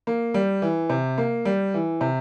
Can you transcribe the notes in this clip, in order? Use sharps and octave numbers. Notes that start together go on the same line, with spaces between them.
A#3
G3
E3
C3
A#3
G3
E3
C3